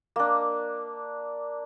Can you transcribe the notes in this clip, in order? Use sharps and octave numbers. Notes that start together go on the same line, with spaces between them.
A#3 D4